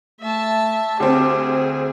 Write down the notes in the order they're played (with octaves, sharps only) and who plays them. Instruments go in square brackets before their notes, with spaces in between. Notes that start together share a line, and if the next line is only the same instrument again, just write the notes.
[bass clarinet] A3 [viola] E5 A5
[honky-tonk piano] D2 C4 [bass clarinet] G4 [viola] G#4